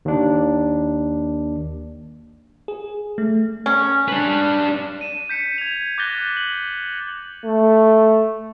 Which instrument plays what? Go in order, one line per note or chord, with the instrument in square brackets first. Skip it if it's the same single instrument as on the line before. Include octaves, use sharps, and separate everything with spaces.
[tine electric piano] D#2 D4
[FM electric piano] G#4
A3
[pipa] C#4
[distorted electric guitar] D4 B4
[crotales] D#7 E7
G6 B6 C#7
G#6 F7
D6 F#6 G6 A6 A#6 G7
F#7
[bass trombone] A3